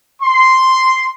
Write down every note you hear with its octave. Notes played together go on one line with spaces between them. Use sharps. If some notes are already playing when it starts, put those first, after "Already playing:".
C6